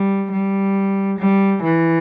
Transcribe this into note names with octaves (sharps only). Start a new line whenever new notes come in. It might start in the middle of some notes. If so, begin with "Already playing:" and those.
Already playing: G3
G3
G3
E3